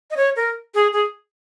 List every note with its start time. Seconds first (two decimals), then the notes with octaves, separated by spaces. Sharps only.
0.11 D#5
0.17 C#5
0.36 A#4
0.74 G#4
0.93 G#4